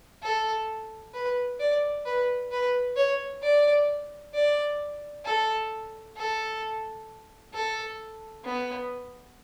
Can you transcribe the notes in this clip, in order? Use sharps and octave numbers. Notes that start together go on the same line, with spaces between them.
A4
B4
D5
B4
B4
C#5
D5
D5
A4
A4
A4
B3